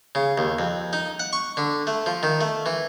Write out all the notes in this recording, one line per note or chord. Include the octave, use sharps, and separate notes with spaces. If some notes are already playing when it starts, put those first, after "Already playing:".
C#3
D#2
F2
D#4
F#5
C#6
D3
A3
F3
D#3
A3
E3